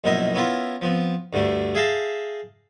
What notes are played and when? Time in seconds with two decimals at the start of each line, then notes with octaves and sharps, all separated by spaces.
0.04 A#1 F#2 B2 D#4 E4 A#4
0.35 B3 C#4 E4 F4 A#4
0.81 F3 B3 C4
1.33 D2 G2 D3 A3
1.75 G#4 E5 F5 G5 A5 A#5